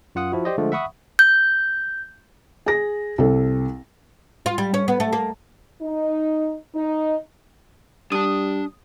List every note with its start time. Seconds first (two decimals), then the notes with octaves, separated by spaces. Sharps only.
0.15 F#2 F4 F#5 D#6
0.32 F3 E4 F#4
0.45 G4 C5 D5 D#5
0.58 D3 F3 G#3 A3
0.72 E5 F#5 B5 C#6 D#6
1.19 G6
2.66 G#4 A#6
3.18 C2 A4
4.46 F4
4.58 G3
4.74 C#4
4.88 B3
5.00 A3
5.13 A#3
5.82 D#4
6.74 D#4
8.12 G3 D4 A5 D#6